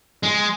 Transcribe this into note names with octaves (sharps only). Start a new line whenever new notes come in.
G#3